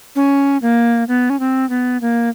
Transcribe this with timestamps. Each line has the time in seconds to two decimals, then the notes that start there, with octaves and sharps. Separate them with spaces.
0.16 C#4
0.62 A#3
1.08 B3
1.30 C#4
1.40 C4
1.69 B3
2.01 A#3